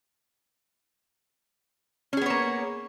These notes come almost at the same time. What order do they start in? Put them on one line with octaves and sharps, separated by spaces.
C#4 G#4 B3 C#5 A#3